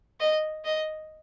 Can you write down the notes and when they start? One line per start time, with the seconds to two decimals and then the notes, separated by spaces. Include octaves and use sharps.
0.20 D#5
0.65 D#5